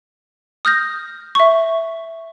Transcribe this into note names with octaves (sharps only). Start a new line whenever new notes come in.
D#6 F6 G6 A#6
E5 C#6